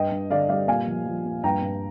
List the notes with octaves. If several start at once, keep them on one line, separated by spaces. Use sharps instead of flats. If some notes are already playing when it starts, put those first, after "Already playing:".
Already playing: G2 D#5 G5
G2
D3 D5 F5
G3 D5 F5
A#2 F5 G#5
F3
F3
A#2
G2 G5 A#5
G2